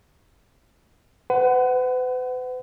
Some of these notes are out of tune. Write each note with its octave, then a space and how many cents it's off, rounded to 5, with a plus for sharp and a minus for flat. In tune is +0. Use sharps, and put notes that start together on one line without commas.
B4 +45 F#5 +15